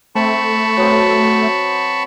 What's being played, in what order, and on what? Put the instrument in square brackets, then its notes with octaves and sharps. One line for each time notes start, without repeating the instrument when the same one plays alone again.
[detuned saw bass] A3 [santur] C4 [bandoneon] A5 B5 C#6
[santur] F#3 B3 C4